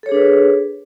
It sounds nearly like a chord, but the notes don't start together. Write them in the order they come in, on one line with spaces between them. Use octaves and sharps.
A4 C#5 G#4 D4 B4